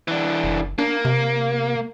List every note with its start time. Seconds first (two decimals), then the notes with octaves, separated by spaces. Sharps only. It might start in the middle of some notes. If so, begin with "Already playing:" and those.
0.08 E3 D4
0.44 F#1
0.78 A#3 D4
1.05 C3